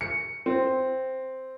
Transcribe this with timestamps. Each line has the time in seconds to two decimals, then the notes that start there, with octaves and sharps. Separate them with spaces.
0.01 C#7
0.46 C4